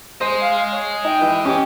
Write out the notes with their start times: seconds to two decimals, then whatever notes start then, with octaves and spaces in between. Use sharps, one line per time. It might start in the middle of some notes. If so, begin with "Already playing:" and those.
0.21 C5 D#5 G#5
0.41 F5
0.71 C#5
1.05 D#4 G5
1.21 E3
1.45 C#4 G4 D6